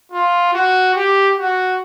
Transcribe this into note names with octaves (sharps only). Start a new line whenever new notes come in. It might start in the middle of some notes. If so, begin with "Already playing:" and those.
F4
F#4
G4
F#4